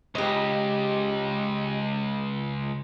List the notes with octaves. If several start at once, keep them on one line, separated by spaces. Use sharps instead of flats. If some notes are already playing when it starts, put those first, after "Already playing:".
C#2 G4 D#5